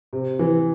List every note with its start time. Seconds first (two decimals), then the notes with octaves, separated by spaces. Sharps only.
0.13 C3
0.39 E3